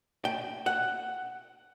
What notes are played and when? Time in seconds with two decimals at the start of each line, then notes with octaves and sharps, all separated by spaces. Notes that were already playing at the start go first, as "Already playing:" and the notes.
0.25 G5
0.66 F#5